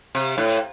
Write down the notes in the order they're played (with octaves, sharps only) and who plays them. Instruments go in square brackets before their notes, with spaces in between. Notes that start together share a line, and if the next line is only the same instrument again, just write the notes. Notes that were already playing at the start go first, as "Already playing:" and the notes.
[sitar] C3
A2